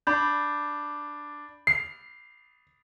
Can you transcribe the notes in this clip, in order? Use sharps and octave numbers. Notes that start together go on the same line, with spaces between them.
D4 B5 G6
C7